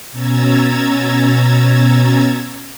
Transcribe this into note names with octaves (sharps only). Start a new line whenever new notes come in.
B2 C#4 A#5 E6 G#6 A6